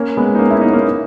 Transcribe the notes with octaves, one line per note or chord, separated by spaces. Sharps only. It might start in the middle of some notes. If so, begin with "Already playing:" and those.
Already playing: A#3 C#4
G#3 B3
D#4
A#3 C#4
C#4 E4
B3 D#4
A#3 C#4